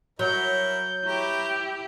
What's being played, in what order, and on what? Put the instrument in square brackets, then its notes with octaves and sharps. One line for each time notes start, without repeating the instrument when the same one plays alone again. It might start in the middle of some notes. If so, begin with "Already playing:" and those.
[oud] F#3 [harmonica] E4 A#4 C#5 [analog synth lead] G6
[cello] E4 G4 [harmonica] B4 C#5 A#5